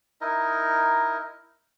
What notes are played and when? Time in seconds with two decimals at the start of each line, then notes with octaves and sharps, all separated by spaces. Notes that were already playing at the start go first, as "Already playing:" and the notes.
0.21 D#4 E4 A#4 D#5